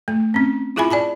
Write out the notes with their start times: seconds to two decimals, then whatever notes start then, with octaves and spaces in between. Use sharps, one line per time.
0.08 A3
0.34 C4 C#4
0.76 E4 F4 G#4 E5 G#5 B5
0.91 D5 G#5 A5 B5